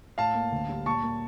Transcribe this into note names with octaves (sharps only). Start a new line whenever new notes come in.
A2 F5 A5
A#3
D2
G3
A#2 A5 C#6
A#3